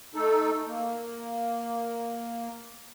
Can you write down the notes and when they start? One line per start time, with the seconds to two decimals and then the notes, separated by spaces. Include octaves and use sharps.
0.15 A3 D#4 A4
0.68 A#3